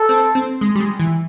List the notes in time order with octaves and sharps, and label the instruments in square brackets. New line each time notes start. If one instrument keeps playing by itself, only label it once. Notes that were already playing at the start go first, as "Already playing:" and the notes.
Already playing: [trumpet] A4
[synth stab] C4
C4
G#3
G3
G#3
E3